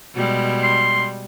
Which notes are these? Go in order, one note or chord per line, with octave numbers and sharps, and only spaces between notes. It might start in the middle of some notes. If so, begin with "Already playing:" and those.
B2 G3 G#3
C6